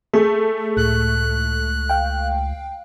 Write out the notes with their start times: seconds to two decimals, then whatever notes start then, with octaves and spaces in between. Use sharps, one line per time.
0.13 A3 G#4
0.77 C#2 A2 F#6
1.89 F5 G5